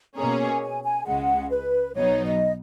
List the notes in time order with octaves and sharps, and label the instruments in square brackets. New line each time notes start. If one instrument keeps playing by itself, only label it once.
[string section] B2 A#3 C#4 G#4 C#5 [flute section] A#5
[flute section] G#5
G#5
G#5
[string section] C#2 C#3 G#3 [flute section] F#5
[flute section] B4
[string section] B1 B2 F#3 B3 D#4 [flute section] C#5
[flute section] D#5